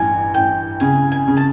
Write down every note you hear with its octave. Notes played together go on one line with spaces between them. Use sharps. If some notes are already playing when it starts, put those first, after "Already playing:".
Already playing: A1 G2 G#5
A1 G5
C#3 G#5
G#5
C#3
A5